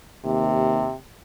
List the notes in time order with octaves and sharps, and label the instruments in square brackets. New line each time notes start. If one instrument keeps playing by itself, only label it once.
[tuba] D#2 [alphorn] C3